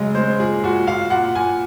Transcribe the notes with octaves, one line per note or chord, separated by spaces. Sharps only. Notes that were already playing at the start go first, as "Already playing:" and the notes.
Already playing: C#3 F#3 G#3 D#5
G#3 C5
A#2 G#4
A#2 F#4
A#2 F5
A#2 F#5
A#2 G#5